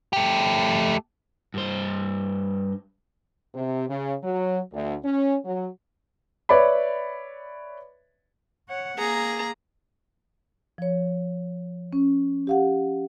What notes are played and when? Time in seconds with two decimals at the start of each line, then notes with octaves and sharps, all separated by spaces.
0.13 A3 G4
1.54 G2 C5
3.55 C3
3.89 C#3
4.23 F#3
4.73 D2
5.04 C#4
5.45 F#3
6.49 B4 C#5 D5 E5 B5
8.69 C#5 F#5
8.99 A#3 G#4 A#5
10.78 F3 C#5
11.93 C#4
12.47 G4 F5 F#5